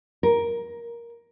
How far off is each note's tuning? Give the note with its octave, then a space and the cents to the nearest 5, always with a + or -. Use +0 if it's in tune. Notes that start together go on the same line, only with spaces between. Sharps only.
A#4 +10